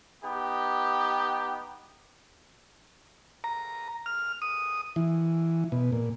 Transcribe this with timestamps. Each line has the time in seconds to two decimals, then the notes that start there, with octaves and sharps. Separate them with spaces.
0.24 B3 D#4 G4
3.44 A#5
4.06 F6
4.42 D#6
4.96 E3
5.72 B2
5.92 A#2